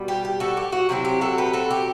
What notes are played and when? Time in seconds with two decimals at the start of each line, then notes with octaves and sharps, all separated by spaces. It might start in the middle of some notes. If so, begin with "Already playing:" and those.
Already playing: B2 G3
0.08 G4
0.25 G4
0.40 F#4 A4
0.57 G4
0.72 F#4
0.89 C3 F#3 C4 E4 G4
1.05 G4
1.21 F#4 A4
1.38 G4 B4
1.53 F#4 A4
1.71 G4